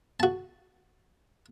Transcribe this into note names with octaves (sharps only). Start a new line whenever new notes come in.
F#4 A5